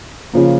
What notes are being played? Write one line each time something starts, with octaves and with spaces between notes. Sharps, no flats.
C#3 F3 A#3